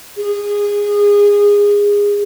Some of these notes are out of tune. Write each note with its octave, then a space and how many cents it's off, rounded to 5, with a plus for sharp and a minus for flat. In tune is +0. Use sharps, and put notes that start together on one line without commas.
G#4 -20